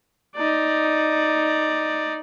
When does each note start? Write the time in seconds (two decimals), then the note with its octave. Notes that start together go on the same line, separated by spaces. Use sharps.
0.36 D#4 D5